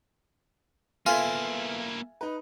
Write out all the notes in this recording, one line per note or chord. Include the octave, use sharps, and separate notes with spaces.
A#3 B3 E4 F4 A4 E5 G#5 G#6
D#4 B4